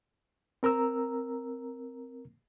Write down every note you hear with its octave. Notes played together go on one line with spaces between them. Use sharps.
C4 A#4 A#5 E6